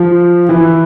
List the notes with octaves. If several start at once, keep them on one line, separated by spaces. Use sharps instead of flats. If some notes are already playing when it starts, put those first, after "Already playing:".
Already playing: F3
E3